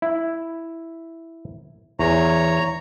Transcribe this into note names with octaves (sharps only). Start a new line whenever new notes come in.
E4
E2 C#5 A#5